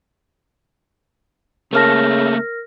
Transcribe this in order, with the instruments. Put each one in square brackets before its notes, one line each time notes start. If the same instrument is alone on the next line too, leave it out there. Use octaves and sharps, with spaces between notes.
[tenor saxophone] C#3 [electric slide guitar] A3 A#3 A5 [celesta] A#4 F6 A#6